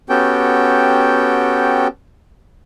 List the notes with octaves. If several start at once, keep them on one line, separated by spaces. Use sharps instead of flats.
B3 C#4 F#4 G4 A4 G5